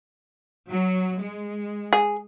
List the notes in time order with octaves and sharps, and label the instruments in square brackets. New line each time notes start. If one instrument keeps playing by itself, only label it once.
[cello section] F#3
G#3
[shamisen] G#4